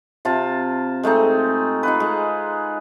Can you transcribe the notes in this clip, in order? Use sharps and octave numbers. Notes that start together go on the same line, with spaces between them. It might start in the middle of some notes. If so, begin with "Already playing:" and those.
C3 F4 A5
G#3 A3 C4 D#4
D#4 F4 B4
G#3